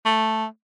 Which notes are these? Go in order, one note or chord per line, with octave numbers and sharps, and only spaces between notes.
A3